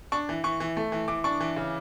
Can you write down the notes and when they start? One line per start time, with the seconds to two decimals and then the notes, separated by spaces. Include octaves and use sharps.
0.12 D4 C#6
0.29 E3
0.44 E3 C#6
0.60 E3
0.77 A3
0.92 E3
1.08 E3 D6
1.24 D4 C#6
1.40 E3
1.56 C#3